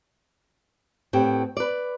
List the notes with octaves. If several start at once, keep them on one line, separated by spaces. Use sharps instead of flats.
A2 B3 C4 G4
B4 D5